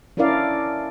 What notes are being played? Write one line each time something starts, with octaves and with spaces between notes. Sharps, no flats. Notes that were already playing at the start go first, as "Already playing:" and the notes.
C#4 D4 E4 A#4 D5 F5